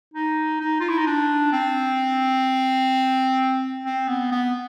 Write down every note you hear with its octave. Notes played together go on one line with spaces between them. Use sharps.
D#4
D#4
F4
E4
D#4
D4
C4
C4
B3
B3